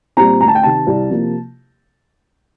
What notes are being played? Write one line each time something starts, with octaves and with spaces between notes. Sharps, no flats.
A#2 G3 C4 A#5
D2 A#5
A5
G5
C3 D#3 A5
C2
C3 F3 A#3